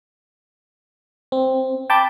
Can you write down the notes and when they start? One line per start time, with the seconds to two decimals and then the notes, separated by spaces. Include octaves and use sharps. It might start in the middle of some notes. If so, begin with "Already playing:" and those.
1.32 C4
1.90 G5 A5 B5 D6 G6